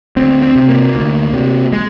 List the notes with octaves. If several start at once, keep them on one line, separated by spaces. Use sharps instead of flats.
D2 C4
C4
C3
A#3
D2
C3
G#3